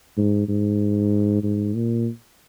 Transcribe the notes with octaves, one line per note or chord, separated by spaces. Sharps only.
G#2
G#2
G#2
A#2